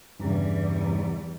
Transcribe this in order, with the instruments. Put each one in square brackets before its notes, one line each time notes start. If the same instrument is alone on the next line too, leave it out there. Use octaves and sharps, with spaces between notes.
[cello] E2 G3 [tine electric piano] G2 C#3